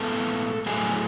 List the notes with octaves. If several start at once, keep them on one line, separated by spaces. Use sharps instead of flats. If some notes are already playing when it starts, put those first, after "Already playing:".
Already playing: A2 G#3 B3 A4
A2 F#3 A3 G#4